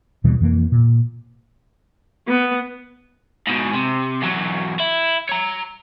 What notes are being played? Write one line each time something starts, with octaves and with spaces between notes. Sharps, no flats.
D#2 B2 E3 G3
F2 E3 A#3
A#2
B3
G#2 B2
C3
E2 F#3
E4
C#5 A#5